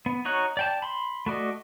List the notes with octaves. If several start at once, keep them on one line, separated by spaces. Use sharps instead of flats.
B3
D#4 F#4 C#5 F#6
D5 G5 A5
B5 C6
A3 F#4 D5 D#5